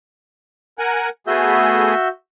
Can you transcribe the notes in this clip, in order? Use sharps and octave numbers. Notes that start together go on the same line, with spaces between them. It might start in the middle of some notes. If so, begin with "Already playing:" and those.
A#4 F#5 G#5
A3 B3 F#4 G#4 E5 G6